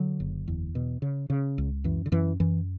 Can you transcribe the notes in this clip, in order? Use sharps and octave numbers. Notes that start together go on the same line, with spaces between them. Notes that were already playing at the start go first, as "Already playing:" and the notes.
Already playing: D3 F#3
F#1
E2
B2
C#3
C#3
C#2
F#2 E3
D3
F#2 E3
F#2 E3